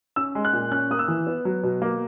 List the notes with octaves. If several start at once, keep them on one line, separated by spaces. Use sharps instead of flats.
C#4 E6
G#3
F#6
A#2
C#4 F#6
A#3 D#6
E6
E3
B3
F#3
B2
A#3